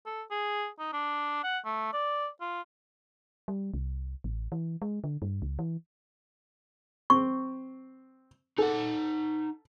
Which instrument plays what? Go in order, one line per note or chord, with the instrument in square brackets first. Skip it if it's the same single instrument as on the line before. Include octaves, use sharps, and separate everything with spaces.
[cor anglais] A4
G#4
D#4
D4
F#5
A3
D5
F4
[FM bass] G3
C2
A1
E3
G#3
D3
G2
C#2
E3
[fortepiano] C4 [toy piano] C#6
[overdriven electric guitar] D#4 F#5 [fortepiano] A4